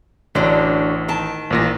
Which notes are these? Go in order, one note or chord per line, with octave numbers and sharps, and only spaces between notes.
A1 D3 F#3 D4
D#3 A5
A1 A#2 A#6